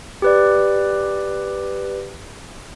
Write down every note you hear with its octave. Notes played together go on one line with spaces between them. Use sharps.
G4 B4 D5